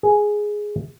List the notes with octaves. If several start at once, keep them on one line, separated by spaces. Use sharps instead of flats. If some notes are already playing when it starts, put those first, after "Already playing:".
G#4